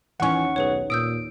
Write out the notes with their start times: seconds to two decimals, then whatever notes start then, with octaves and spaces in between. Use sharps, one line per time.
0.20 D#2 E3 C#4 F#5 C#6
0.56 B1 G#4 B4 C#5
0.90 A#2 D#6 E6 G6 D7